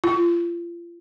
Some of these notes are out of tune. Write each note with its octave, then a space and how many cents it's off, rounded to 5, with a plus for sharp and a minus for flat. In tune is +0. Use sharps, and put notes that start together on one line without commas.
F4 -30